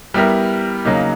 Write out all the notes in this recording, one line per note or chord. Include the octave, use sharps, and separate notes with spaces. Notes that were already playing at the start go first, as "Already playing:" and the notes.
G3 B3 E4 G4 A#4
C#3 F#3 A#3 D#4